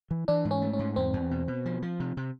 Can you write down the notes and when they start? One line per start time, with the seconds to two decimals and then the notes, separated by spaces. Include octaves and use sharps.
0.11 E3
0.28 E3 D4
0.45 G#2
0.51 C#4
0.62 A3
0.73 C#4
0.79 G#2
0.96 E2 C4
1.13 E2
1.31 B2
1.48 B2
1.65 F3
1.82 F3
2.00 C3
2.17 C3